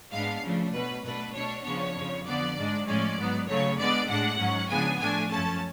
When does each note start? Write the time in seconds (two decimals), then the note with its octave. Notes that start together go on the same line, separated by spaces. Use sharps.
0.12 G#2 G#3 B3 D4 F5
0.43 C#3 F3 A3 D4
0.74 B2 F#3 A3 B4
1.04 B2 A3 D4 B4
1.34 B2 A3 D4 C#5
1.65 C#3 F3 B3 D4 C#5
1.95 F2 C#3 F3
2.26 D3 F3 B3 D5
2.56 G#2 G#3 D4
2.87 A2 F3 G#3 C#4 D5
3.17 G#2 F#3 B3
3.48 C#3 F#3 A3 C#5
3.78 D3 G#3 B3 D5
4.09 A2 G#3 D4 F#5
4.39 G#2 F#3 C#4
4.70 C#3 F3 G#3 B3 D4 G#5
5.00 A2 F3 A3 D4 G#5
5.31 F#2 F3 A3 C#4 A5